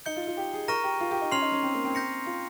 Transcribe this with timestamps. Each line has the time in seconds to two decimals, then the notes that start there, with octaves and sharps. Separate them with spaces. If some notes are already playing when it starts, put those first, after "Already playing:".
0.06 D#4 G6 C#7 G7
0.16 F4
0.27 F4
0.37 G4
0.54 G#4
0.68 A#4 A#5 C#6 F6 A#6 D#7
0.84 G4
1.00 F4
1.11 G4
1.22 D#4
1.31 C#4 C6 F6 C7 F7
1.42 D#4
1.52 C#4
1.63 C4
1.74 A#3
1.85 C4
1.95 G6 A#6 C#7
2.26 F4